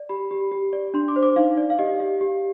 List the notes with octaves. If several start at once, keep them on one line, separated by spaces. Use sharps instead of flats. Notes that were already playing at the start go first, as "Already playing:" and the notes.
Already playing: D5
G4 B5
G4
G4
D5
D4 C6
D6
C5
D6
D#4 F5
D5
F5
G4 D#5
G4 F5
G4